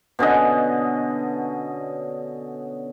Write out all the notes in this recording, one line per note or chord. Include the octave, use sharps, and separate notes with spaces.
B2 D3 C#4 D#5